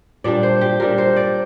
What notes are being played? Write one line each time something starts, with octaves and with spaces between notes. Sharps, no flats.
A#2 G3 D4 D5
C5
G4
A#2 G3 D4 A#4
C5
D5